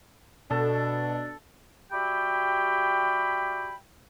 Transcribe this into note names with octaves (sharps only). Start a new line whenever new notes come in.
B2 D4 A4
G3 F#4 G4 E5 G5 B5